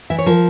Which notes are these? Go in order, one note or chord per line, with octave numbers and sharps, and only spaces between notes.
E3 E5
C#5
F3 A#4